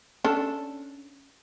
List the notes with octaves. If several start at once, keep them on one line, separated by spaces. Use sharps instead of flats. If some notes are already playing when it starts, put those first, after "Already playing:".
C#4 D4 A4